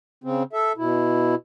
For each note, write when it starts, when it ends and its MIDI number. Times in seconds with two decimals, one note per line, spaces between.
0.24 0.43 49
0.24 0.43 60
0.53 0.72 69
0.53 0.72 76
0.77 1.35 47
0.77 1.35 64